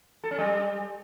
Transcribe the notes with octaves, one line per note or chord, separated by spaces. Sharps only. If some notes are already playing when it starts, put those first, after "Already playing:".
A4
C#4
G3